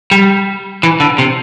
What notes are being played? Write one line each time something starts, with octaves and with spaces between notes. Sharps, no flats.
G3
E3
D3
C3